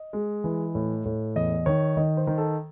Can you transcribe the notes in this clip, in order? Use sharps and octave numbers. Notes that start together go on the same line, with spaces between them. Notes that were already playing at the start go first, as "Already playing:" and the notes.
Already playing: D#5
G#3
E3
A2
A2
E2 D#5
D#3 C#5
D#3 D#5
C5
D#3
A4